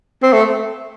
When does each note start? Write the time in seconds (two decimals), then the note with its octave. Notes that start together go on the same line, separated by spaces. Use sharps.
0.23 C4
0.33 A3